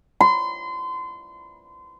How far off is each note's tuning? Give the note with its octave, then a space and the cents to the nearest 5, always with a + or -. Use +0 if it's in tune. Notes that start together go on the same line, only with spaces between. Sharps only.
C6 -30